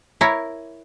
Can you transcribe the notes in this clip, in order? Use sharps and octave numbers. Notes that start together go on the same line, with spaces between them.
E4 A#4 C#5